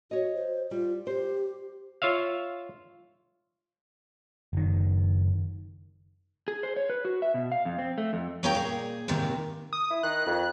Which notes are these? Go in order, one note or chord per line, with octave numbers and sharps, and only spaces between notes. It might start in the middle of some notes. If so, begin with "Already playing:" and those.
F#4 C#5 D#5
C5
G3 F4
G4 C5
F4 C#5 E5 F5
F#1 D#3
G#4
C5
C#5
B4
F#4
E5
B2
F5
F2
C4
A3
F2
F#3 A#3 C#4 G#4 G5 A#5
A#2 G#4
D#2 G#2 C3 D#3
D#6
E4
D#3 F#6
F2